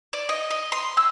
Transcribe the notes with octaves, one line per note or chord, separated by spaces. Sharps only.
D5
D#5
D#5
C6
E6